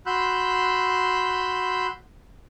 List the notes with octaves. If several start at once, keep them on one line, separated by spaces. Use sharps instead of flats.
F#4 B5 C6 E6 F#6 G6